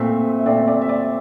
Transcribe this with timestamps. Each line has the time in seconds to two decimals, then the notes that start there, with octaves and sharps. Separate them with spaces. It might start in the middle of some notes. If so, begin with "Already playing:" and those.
Already playing: A#2 A3 C4 E5
0.39 E5
0.46 A#2 A3 C4 D5
0.67 D5
0.82 E5
0.89 D5